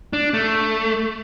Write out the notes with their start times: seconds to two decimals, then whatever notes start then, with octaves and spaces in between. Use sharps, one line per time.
0.13 D4
0.34 A3